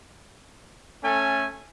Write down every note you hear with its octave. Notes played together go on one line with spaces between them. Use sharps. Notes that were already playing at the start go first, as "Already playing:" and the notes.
A3 C#4 A4 G#5